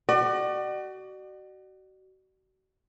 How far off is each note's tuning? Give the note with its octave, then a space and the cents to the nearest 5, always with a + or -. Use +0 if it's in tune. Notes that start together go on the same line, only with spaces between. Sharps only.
F#4 +35 D5 +40